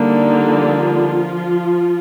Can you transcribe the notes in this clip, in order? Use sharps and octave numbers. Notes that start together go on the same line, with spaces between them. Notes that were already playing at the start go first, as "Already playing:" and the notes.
Already playing: D3 G3 A#3 D#4
F3 F4